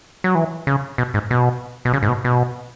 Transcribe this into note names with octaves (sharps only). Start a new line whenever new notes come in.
F#3
E3
C#3
B2
G#2
B2
B2
C#3
G#2
B2
B2